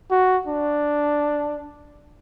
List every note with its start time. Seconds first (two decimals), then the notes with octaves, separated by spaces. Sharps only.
0.11 F#4
0.48 D4